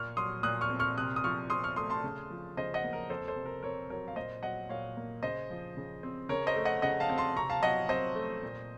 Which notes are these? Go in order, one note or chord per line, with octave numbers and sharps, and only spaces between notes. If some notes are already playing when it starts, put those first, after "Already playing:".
Already playing: A#2 C#6 F6
F#3 C6 D#6
A#2 D#6 F#6
C#6 F6
C4
C#6 F6
C3 D#6 F#6
D#6
F3 C#6 F6
C4 C6 D#6
C#6 F6
A3 C6 D#6
A5 C6
C#3
F3
C#3 C5 D#5
D#5 F#5
A#3
A#4
F2 A4 C5
A4 C5
C3
A#4
C4 A#4 C#5
F#3 A#4 C#5
F5
A#2 C5 D#5
F#3 D#5 F#5
A#2 C#5 F5
A#3
C#3 C5 D#5
F3
C#3
C4
C#3 A#4 C#5
C5 D#5
A3
D#5 F#5
C#3 D#5 F#5
F5 A5
C4
A5 C6
C3 A#5 C#6
F5 A5
F#3 D#5 F#5
C4 C5 D#5
A3
A#2